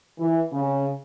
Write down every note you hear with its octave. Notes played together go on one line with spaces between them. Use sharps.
E3
C#3